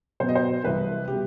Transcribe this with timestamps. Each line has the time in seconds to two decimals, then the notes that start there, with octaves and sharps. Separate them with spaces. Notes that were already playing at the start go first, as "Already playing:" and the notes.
0.20 B2 F#3 B3 C5
0.29 D#5
0.35 C5
0.64 C2 C3 E3 B4
1.08 B2 G3 G4